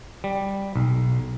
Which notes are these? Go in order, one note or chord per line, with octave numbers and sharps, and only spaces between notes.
G3
B1